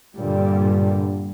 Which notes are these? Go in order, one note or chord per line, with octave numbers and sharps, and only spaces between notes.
G2 A#2 D3 G3